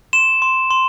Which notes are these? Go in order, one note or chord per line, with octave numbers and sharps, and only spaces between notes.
C6 E7
C6
C6